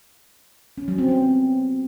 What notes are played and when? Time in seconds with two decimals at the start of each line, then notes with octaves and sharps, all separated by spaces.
0.78 C#4
0.88 F#3
0.98 C4
1.09 B3